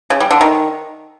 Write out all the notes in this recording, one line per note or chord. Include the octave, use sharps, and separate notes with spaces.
C#3
G3
D3
D#3